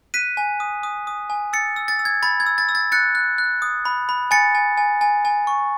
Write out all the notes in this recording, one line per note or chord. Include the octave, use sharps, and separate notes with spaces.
F#6 B6 D#7
G#5
D#6
D#6
D#6
G#5
E6 A6 C#7
E6
A6
E6
G#6
B5 A6
G#6
E6
A6
E6
A6
F#6 A6 C#7
F#6
F#6
D#6
B5
B5
G#5 A6 C#7
G#5
G#5
G#5
G#5
C#6